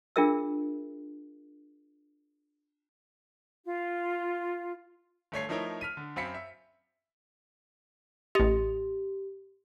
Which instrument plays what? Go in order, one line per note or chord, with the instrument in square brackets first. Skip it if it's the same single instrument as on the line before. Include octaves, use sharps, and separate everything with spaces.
[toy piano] D4 F4 G#4 A#4 E5 E6
[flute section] F4
[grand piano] G1 A3 C#5 C7
F3 A3 D#4 E4 A#4 C#5
F6 B6 D#7
D3
F#2 C4 F5 B5 B6 C#7
E5
[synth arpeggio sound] A1 D#5 [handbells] G4